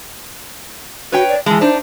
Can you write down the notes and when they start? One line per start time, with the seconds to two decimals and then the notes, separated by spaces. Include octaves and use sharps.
1.12 F#4 B4 C#5 G5
1.29 D5
1.46 E3 G#3 A5
1.61 D4 D#4 C5